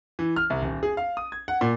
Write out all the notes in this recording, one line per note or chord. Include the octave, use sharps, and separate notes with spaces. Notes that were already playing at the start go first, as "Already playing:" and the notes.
E3
F6
C2
D#1
G#4
F5
D#6
G#6
F#5
A#2